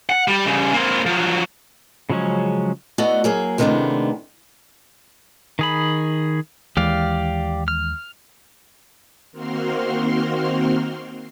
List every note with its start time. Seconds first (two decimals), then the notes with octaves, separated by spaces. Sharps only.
0.09 F#5
0.28 G3
0.46 C#3 G3
0.73 A#3 C4
1.06 F3 F#3
2.10 C#3 F3 F#3 G#3 C#4
2.98 A3 B3 F#4 A4 D5 D#5
3.24 F#3 A#3 G#4
3.58 C3 D#3 G#3 A3 B3 D4
5.59 D#3 G#4 B5
6.77 D#2 E3 G#3 G4 D5 F5
7.68 F6
9.32 D#3 A#3 C4 F#4 C6 F6